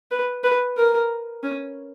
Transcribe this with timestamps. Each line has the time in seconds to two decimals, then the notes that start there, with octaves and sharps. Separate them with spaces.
0.11 B4
0.44 B4
0.77 A#4
1.43 C#4